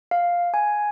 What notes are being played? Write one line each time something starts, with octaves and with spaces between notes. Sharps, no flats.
F5
G#5